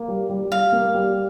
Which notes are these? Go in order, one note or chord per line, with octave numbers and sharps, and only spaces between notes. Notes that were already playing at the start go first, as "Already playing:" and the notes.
Already playing: A#3
G3
G3
G3 F5
A#3
G3